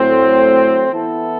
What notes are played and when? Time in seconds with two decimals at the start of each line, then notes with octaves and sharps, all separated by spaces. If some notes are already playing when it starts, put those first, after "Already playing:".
Already playing: A2 F#3 A3 C4
0.90 E3 B3 E4 A4